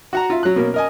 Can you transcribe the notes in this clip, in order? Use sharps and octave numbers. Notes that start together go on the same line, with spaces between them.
F#4 F#5 A#5
F4 E5
F#3 F#6
B2 A#3 C#4
A#4 D#5 G#5